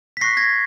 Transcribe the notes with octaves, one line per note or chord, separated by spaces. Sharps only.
B6
C#6 F#6 A#6 C7
G#6 A#6